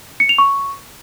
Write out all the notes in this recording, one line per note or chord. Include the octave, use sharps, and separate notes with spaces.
C#7
F7
C#6